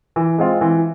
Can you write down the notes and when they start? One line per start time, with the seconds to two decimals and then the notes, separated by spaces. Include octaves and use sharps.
0.16 E3
0.38 G#3 C4 F4
0.61 E3